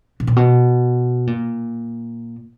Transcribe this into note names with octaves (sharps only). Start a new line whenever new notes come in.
B2
A#2
B2
A#2